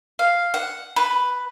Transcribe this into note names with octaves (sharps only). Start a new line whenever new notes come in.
F5
F#5
B4